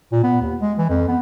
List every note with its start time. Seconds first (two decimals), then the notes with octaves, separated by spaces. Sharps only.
0.12 A#2
0.23 B3
0.41 D#2
0.61 G#3
0.78 E3
0.89 F2
1.08 B3